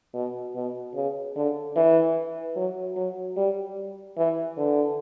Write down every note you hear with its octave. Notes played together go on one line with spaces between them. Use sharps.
B2
B2
C#3
D3
E3
F#3
F#3
G3
E3
D3